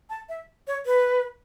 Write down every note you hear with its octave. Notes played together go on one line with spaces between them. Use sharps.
A5
E5
C#5
B4